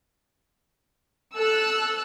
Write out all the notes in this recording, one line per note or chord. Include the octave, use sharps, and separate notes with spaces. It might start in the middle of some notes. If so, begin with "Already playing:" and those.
A4 E6 F#6